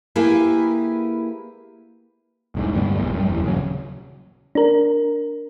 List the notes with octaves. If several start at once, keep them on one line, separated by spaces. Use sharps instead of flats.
A#3 E4 G4 G#4 B4 G5
E1 C2 G#2
D2 G2 G3 B3
E1 A#1
F#2 G3
F#1 E2
D#1 C#3 F#3
D4 A#4